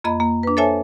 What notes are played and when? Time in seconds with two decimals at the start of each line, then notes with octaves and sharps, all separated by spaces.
0.04 F2 A#3 D#5 B5
0.20 A#3
0.43 D4 B4
0.57 A4 C5 C#5 E5 G#5 A5